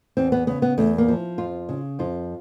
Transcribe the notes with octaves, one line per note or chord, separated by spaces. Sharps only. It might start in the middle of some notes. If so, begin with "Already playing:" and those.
E2 C4
B3
C#3 B3
B3
E2 A3
A#3
F3
F2 F4
C#3
F2 F4